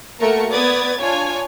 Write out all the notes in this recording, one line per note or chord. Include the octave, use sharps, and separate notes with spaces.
A3 A#3 F#4 A#4 C#7
B3 B4 D5 D#6 G#6 A6
D4 F4 C#5 G#5